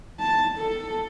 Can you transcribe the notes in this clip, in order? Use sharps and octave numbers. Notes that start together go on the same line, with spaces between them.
A5
A4